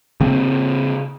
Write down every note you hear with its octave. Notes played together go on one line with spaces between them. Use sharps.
C#3 A#3 C4